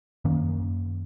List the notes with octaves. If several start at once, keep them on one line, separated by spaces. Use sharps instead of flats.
F#2 D#3 A#3 C#4